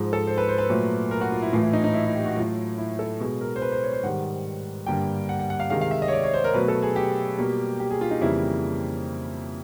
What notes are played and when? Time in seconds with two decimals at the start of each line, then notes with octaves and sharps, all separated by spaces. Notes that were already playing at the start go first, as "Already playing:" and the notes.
Already playing: G#2 F3 G#3
0.13 A4
0.27 C5
0.38 B4
0.49 C5
0.58 B4
0.69 A#2 F#3 A3
1.11 A#4
1.21 F#4
1.32 F4
1.42 E4
1.53 A2 E3 A3 F4
1.63 E4
1.73 D#4
1.84 D#4
1.94 E4
2.05 E4
2.15 G4
2.26 F#4
2.36 A2 F#3 A3 F4
2.78 E4
2.99 A4
3.20 B2 G#3
3.41 A#4
3.56 C5
3.62 B4
3.72 C5
3.83 C#5
3.93 C5
4.03 G#2 D#3 G3 F#5
4.86 G2 D3 G3 A#3 G5
5.29 F#5
5.39 F#5
5.50 F#5
5.60 F5
5.70 C3 D#3 G#3 F5
5.81 F5
5.91 E5
6.02 D#5
6.08 C#5
6.12 D5
6.23 C#5
6.34 C5
6.44 A#4
6.54 B2 F#3 A3 B4
6.68 A4
6.82 G#4
6.96 G4
7.38 B2 G3 A#3
7.80 G4
7.90 G#4
8.01 F4
8.11 D#4
8.21 F2 C#3 E3 G3 A#3 E4